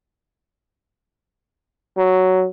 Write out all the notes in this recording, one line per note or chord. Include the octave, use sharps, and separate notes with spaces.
F#3